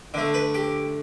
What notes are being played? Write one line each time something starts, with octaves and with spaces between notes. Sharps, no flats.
D3 A3
B4
G4